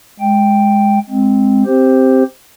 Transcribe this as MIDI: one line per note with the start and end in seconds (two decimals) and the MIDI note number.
0.20 0.99 56
0.20 0.99 79
1.10 1.64 56
1.10 1.64 60
1.66 2.23 60
1.66 2.23 67
1.66 2.23 72